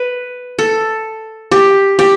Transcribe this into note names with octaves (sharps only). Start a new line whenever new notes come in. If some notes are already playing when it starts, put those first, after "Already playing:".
Already playing: B4
A4
G4
G4